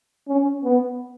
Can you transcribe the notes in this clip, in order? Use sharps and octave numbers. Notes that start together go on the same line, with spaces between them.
C#4
B3